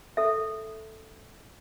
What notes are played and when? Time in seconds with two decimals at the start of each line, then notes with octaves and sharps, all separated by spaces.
0.17 A4 E5